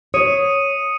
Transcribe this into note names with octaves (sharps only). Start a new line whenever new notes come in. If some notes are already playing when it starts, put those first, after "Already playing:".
C#5 D#6 C#7 D#7